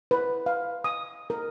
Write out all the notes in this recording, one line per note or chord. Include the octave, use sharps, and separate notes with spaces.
B4
F5
D#6
A#4